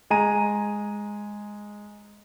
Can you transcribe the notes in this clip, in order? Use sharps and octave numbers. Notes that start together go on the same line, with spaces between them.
G#3 G#5 A#5 D#7